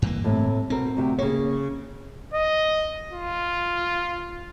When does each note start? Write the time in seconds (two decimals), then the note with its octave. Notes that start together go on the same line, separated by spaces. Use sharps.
0.02 G2 E3 A#3
0.24 A2 C3
0.70 B2 C4 A#4
0.97 D2 C3 G4
1.18 C#3 A#3 C#5
2.34 D#5
3.12 F4